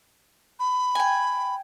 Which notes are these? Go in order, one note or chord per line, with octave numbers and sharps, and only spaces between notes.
B5
G5 G#5